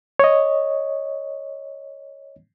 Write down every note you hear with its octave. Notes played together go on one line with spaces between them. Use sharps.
C#5 D#5